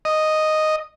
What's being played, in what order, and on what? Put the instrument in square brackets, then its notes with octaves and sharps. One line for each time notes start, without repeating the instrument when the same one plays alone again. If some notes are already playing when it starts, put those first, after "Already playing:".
[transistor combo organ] D#5